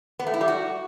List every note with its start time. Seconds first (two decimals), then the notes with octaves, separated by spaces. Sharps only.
0.20 B3
0.27 A3
0.34 E4
0.41 G3
0.48 F#4